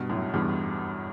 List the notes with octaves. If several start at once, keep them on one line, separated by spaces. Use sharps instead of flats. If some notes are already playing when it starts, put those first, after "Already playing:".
Already playing: G2 B2
F#2 A2
E2 G2